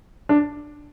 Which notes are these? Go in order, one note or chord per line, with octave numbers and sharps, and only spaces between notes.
D4